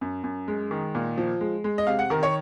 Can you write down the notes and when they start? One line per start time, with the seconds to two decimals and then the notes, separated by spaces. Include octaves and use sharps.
0.01 F#2
0.24 F#2
0.48 G#3
0.71 D#3
0.95 A#2
1.18 F3
1.41 G#3
1.64 G#3
1.78 D#5
1.87 C3 F5
1.99 F#5
2.10 D#3 A#4
2.23 C#5